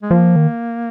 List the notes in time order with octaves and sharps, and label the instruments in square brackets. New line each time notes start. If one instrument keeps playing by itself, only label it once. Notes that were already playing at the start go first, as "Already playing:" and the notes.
[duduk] G#3
[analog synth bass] F3 [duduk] A#3
[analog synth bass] D#3